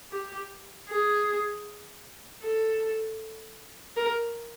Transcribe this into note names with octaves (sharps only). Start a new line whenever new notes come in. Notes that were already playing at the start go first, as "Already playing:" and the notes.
G4
G#4
A4
A#4